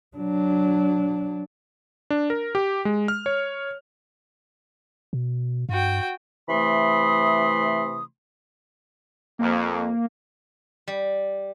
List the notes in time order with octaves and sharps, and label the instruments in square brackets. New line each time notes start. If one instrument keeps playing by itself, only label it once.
[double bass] F#3 D4
[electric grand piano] D4
A#4
G4
G#3
F6
C#5
[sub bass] B2
[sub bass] G2 [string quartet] F#4 G5
[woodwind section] C3 E3 A3 B5 C6 D#6
[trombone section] F2 [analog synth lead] A#3
[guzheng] G3